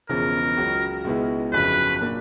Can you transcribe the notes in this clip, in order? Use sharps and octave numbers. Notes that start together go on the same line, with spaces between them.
E1 E2 C#3 F3 A#4
C#2 C#3 F#3
C#2 B2 G#3 B3 E4
G1 F2 C#3 F#3 B4
A#2 F#3 A#3 D4